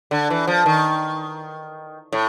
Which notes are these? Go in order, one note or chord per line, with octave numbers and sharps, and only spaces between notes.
D3
E3
F3
D#3
A2